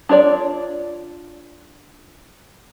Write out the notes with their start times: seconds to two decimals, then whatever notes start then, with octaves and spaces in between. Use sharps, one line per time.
0.09 D4 F4 C#5 D5